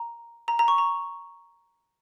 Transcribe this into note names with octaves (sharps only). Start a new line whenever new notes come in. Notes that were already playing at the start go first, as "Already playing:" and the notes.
Already playing: A#5
A#5
A#5
C#6
A#5